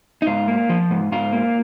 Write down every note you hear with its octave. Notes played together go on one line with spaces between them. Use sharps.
D#4
G#2 F4
A#3
F3
G#2
G#2 F4
A#3